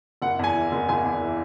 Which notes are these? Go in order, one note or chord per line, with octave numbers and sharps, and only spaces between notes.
F#1 F#5
E2 G#5
E3
F#1
F#1 G#5
E2
E3